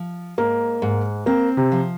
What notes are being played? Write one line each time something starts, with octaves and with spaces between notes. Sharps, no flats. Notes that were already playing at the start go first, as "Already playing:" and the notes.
Already playing: F3
G#2 A#3
G#2
A#3 C4
C3
F3